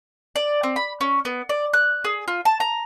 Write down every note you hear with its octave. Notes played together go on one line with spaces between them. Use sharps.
D5
C4
B5
C#4
B3
D5
F#6
G#4
F4
A5
A#5